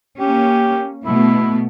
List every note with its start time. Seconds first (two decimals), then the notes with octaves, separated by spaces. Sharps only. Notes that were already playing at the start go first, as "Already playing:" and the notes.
0.20 A#3 C#4 G4
1.05 B2 A3 B3 E4